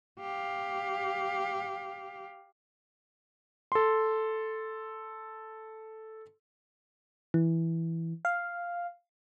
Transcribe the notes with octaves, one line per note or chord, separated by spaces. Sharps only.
G4 F5
A4 C6
E3
F5